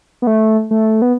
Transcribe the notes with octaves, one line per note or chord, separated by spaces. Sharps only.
B3
A3
A3
B3